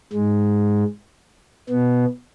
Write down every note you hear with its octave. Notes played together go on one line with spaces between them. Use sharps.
G#2 G#3
B2 B3